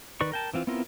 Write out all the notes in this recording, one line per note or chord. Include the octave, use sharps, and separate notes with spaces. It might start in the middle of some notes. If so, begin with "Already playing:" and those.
D#3 B4 D5 C#6
A#4 G5 A5
E3 C4 F4
B3 C4 E4 F4 A#4